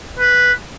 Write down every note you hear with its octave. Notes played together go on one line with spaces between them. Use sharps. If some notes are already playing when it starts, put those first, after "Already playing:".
B4